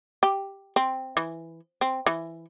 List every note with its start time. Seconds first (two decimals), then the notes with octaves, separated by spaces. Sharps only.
0.23 G4
0.76 C4
1.17 E3
1.81 C4
2.07 E3